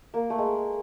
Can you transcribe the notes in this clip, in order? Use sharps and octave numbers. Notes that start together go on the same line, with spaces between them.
A#3
A3
G#3